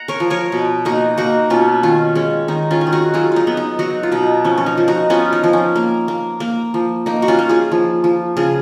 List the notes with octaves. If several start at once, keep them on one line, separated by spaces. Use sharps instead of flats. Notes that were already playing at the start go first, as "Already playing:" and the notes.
Already playing: F#5 A#5
A#4 C#5
F3
A#4 C#5
B2
A#3 D#4 F#4
A#3 D#4 F#4
B2 C#4 F4
D#3 C#4 F4
G#3 C#4
D#3 D#4
C#4 F4
D#3
G#4
D#4 F#4
F#3 F4 G#4
D#4 F4
B3
D#4
F#3 D#4 F#4
F4
B2 D#4
F3 C#4
C#4
D#4
F3
D#4 F#4
B3 C#4 F4
D#4
F3
C#4
A#3
A#3
A#3
F3
A#3 D#4
F#4
C#4 F4
A#3
F4 G#4
F3
F3
C#3 F4 G#4